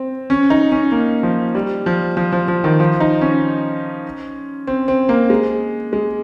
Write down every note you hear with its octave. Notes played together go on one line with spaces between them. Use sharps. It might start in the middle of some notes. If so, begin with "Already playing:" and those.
Already playing: C4
C#4
D#4
C#4
A#3
F3
G3
F3
F3
F3
F3
D#3
F3
D#4
C#4
C4
C4
A#3
G#3
G#3